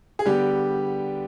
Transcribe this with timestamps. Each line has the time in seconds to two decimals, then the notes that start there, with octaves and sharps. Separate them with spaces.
0.19 G#4
0.26 D3 G3 B3 G4